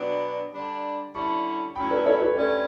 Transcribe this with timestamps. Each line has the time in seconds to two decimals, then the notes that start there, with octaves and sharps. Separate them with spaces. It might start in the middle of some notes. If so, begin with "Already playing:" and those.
Already playing: B2 F#3 B3 D4 G5 B5
0.53 D3 G3 D4
1.14 D3 G3 C#4 E4 A5 C#6
1.75 A2 F#3 C#4 E4 G5 B5
1.91 B4 D5
2.06 A4 C#5
2.21 G4 B4
2.37 D2 D3 A3 C#4 B4 D5